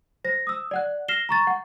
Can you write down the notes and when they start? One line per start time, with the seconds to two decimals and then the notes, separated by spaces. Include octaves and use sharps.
0.24 C5 A#6
0.47 D#6 E6
0.71 D5 F#5 F#6
1.08 F6 A#6 C7 E7 G7
1.29 A#5 C#6 A6
1.47 F#5